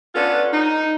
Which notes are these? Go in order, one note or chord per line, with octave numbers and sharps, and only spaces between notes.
B3 C#4 D4 F4 A4 B4
D#4